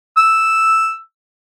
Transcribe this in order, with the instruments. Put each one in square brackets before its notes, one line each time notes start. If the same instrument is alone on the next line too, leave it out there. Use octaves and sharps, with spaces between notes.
[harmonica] E6